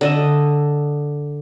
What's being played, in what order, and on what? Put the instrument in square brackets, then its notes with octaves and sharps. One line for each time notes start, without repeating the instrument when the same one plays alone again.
[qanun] D3 D#5 E5